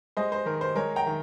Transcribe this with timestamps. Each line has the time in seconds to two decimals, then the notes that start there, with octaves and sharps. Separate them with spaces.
0.17 G#3 C5 D#5
0.32 C5
0.46 D#3 A#4
0.61 C5
0.75 G#3 A#4 C#5
0.96 G5 A#5
1.06 D#3